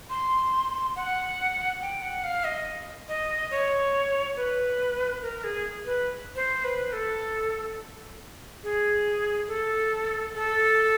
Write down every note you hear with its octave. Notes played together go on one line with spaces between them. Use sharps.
C6
F#5
G5
F#5
F5
D#5
D#5
C#5
B4
A#4
G#4
B4
C5
B4
A4
G#4
A4
A4